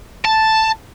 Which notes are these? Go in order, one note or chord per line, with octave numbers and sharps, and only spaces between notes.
A5